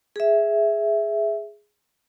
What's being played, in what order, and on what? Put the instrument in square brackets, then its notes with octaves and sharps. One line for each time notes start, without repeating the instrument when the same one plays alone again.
[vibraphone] G#4 E5